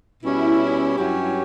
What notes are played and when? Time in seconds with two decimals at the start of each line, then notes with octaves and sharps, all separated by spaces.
0.21 B2 G3 C#4 E4
0.97 G2 F#3 C#4 G4